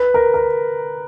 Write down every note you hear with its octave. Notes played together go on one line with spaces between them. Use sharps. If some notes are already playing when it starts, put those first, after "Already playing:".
Already playing: B4
A#4
A#4